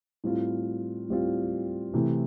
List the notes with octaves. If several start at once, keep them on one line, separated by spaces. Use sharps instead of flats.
A2 G3 C4 F4
A2 G3 C4 F4
C3 E3 A3